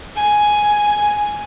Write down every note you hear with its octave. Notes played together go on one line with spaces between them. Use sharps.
G#5